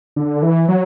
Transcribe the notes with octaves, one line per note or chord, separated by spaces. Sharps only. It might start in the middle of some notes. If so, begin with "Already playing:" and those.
D3
E3
F#3